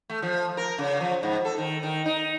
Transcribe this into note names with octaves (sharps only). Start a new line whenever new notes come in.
A3
F3
A#4
C#3
F3
G#2
A4
D#3
D#3
D#4